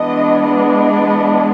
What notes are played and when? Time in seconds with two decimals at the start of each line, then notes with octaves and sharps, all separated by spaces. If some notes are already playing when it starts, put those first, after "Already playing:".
Already playing: E3 G#3 B3 D4 D#5
0.44 D#5